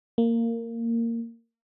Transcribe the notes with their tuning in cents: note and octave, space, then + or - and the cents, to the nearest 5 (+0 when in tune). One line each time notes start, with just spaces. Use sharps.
A#3 -15